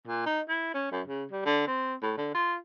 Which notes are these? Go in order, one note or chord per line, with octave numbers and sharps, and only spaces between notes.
A#2
D#4
E4
C#4
F#2
C#3
G3
D3
C4
A2
D3
F4